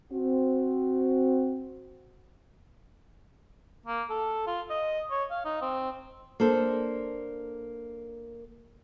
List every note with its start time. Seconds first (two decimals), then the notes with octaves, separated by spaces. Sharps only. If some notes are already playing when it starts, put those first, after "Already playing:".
0.12 C4 F#4
3.86 A#3
4.10 A4
4.47 F4
4.70 D#5
5.11 C#5
5.31 F5
5.45 D#4
5.62 C4
6.40 A#3 D4 A4 C5